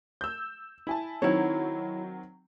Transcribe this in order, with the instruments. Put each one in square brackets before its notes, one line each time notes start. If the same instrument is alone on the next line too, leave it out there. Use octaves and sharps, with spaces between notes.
[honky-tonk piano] E6 G6
E4 G#5 A5
[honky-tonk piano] D#3 F#3 C4 [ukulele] E4 C#5